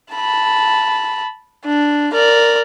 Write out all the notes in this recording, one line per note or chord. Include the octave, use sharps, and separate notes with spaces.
A5 B5
D4
A#4 D5